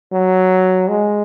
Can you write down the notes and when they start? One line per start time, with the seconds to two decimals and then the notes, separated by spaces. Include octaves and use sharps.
0.12 F#3
0.89 G#3